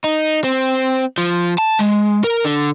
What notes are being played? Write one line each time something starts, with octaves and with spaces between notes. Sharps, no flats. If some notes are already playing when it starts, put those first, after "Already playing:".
D#4
C4
F3
A5
G#3
A#4
D3